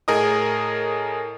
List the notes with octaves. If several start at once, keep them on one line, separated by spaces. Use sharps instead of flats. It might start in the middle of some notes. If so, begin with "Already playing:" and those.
A2 G#4 A#4 D#5 D#6